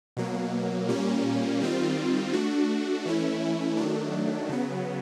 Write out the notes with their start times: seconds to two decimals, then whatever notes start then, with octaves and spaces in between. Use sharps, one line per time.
0.17 B2 F#3 A#3
0.89 A#2 G3 A#3 C#4
1.61 D#3 G3 C4 F4
2.33 A3 D4 F#4
3.05 E3 A3 C#4 E4
3.77 D#3 F#3 A3 D4
4.49 C#3 F#3 B3